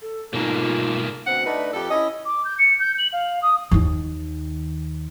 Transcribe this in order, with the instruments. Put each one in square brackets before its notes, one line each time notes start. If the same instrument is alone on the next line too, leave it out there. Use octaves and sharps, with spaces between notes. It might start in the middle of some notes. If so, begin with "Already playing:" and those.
[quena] A4
[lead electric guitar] G#2 A#3 [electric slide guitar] B2 G#4 A4 [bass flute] D#4 [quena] F4
[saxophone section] D2 B2 C4 F#5
A3 D4 D#4 B4
F2 G4 A4
C#4 E4 D#5
[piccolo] D6
G6
C#7
G6
F#7
F5
D#6
[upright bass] D#2 D#3